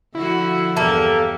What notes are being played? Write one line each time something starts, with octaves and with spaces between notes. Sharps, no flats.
D3 F3 E4 F#4
E2 G2 A#3 G4 A4